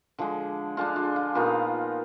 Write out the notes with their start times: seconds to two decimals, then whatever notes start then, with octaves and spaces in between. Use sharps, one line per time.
0.18 D3 F3 G#3
0.77 D3 G#3 D4 F4
0.96 F4
1.16 F4
1.35 A#2 F3 B3 D#4 F4